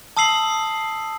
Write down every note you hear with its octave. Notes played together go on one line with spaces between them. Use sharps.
A5 D#6 E6 C7 F#7